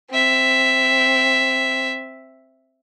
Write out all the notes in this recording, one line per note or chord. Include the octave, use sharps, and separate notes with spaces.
C4 E5